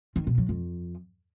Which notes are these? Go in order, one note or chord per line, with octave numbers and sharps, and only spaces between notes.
D#3
B2
F#3
F2